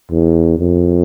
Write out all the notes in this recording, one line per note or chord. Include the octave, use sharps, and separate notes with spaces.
E2
F2